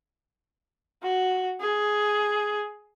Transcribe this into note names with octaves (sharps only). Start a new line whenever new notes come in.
F#4
G#4